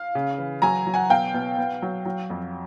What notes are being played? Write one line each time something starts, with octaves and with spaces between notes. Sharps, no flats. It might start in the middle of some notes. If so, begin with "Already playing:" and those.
Already playing: F5
C#3
E3
F#3 G#5 A#5
F#3
F#5 G#5
B2 F5 G5
B2
B3
F#3
F#3
F2